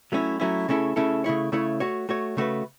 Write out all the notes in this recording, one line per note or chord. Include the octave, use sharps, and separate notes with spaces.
F#3 A3 C#4 E4
F#3 A3 C#4 E4
C#3 A3 C#4 E4 A4
C#3 A3 C#4 E4 A4
C#3 A3 E4 C#5
C#3 A3 E4 C#5
A3 F#4 C#5
A3 F#4 C#5
C#3 A3 F#4 B4